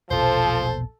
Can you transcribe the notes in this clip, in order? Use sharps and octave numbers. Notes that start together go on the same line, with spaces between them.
E1 A#1 B2 F3 A4 C5